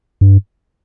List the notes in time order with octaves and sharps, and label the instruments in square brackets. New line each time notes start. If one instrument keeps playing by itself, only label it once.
[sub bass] G2